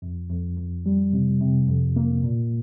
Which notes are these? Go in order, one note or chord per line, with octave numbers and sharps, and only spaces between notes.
F2
F2
F2
G3
C3
C3
F2
A#3
A#2